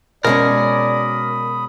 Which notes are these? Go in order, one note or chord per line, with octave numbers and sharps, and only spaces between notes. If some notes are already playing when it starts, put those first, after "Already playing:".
B2 G#3 C#4 A#4 D5 B5 D#6